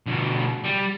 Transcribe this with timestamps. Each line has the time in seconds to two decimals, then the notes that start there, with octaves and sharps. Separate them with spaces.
0.07 D2 B2
0.64 G3